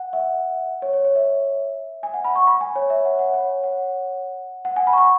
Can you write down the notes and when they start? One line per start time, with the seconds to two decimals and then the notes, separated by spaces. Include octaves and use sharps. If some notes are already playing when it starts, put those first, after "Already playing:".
Already playing: F#5
0.13 E5
0.82 C#5
0.93 C#5
1.05 C#5
1.16 E5
2.03 G#5
2.14 F#5
2.24 B5
2.36 C#6
2.47 B5
2.61 G#5
2.76 C#5
2.90 E5
3.05 F#5
3.19 F#5
3.34 C#5
3.64 F#5
4.65 F#5
4.76 G#5
4.87 B5
4.93 C#6
4.98 B5